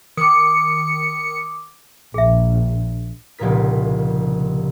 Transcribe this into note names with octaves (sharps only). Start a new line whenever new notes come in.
D#3 D6 D#6 C#7
A#1 G#4 E5
F1 C2 A#2 C#3 A#4 B6